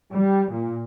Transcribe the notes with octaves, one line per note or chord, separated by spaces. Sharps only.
G3
A#2